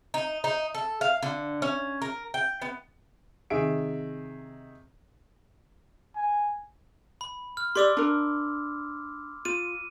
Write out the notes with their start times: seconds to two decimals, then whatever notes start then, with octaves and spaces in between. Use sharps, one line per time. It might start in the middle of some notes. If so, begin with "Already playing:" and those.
0.14 D#4
0.44 D#4
0.75 A4
1.01 F5
1.23 D3
1.62 C#4
2.02 A#4
2.34 G5
2.62 B3
3.50 C3 D#3 G#4 E5 D7
6.16 G#5
7.21 B5
7.57 F6
7.75 G4 D5 C6 D6 E6
7.97 D4 A#4
9.45 F4 D#7